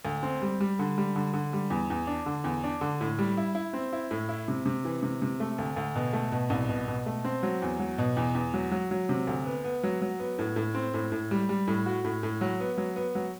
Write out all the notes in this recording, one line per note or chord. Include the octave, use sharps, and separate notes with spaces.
D2
C4
G3
G3
D3
G3
D3
D3
G3
E2
E2
D4
D3
E2
D4
D3
A2
G3
E4
E4
C4
E4
A2
E4
C3
C3
E3
C3
C3
A3
D2
D2
B2
A3
B2
C2
B2
B2
A3
C4
F#3
E2
F#3
B2
E2
E2
F#3
F#3
F#3
C3
D2
B3
B3
F#3
F#3
B3
A2
A2
C4
A2
A2
G3
G3
A2
F#4
A2
A2
F#3
B3
F#3
B3
F#3